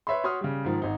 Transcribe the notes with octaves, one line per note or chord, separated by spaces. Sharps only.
B4 C#5 E5 B5 C6
F#4 C#5 C6 D#6 F6
C#3 G3
G#2 D#3 F3
G#1 D#4